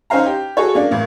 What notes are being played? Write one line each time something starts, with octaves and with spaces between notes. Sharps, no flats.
C#4 D#4 C5 F5 A#5
G4
F#4 G#4 A4 C#5
A#3 C#4 D4
A1 A#3